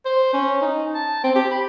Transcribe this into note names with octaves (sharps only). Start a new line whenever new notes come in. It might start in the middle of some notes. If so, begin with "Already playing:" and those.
C5
C#4
D#4
A5
C4
G4
B5